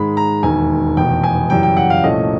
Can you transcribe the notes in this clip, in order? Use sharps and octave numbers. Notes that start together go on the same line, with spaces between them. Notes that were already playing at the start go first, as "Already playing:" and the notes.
Already playing: G#2 D#3 G#3 B5
A#5
E1 D#2 D#3 G#5
F1 E2 B2 G5
G#5
F#2 C#3 E3 G3 G5
G5
F#5
F5
C2 A#2 F3 A3 C#4 D#5